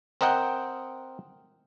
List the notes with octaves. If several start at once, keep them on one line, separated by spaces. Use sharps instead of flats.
C4 A#4 D#5 F#5 G5